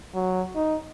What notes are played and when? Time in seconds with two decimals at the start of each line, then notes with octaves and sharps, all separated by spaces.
0.14 F#3
0.55 D#4